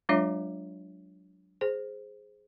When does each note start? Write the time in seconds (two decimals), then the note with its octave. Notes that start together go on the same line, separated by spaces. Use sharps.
0.09 F#3 G#3 D4 F4 C#5 E5
1.61 G#4 C5